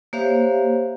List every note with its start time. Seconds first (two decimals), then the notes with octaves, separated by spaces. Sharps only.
0.13 A#3 G4 C5 C#5 E5 F5